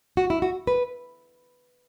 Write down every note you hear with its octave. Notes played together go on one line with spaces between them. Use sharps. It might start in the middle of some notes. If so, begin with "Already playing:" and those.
F#4
E4
F#4
B4